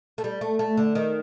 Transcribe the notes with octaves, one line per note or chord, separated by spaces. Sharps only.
A3
G3
A3
A3
D3
D#3